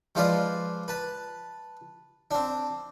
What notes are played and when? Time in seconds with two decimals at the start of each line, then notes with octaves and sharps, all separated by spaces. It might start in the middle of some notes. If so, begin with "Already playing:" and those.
0.15 F3 G#3 F4 B4 D5 F5
0.88 B4 A5
2.31 C4 D4